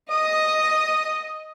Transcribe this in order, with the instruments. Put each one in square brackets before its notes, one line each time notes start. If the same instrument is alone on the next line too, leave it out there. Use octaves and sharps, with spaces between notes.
[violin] D#5 [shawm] D#6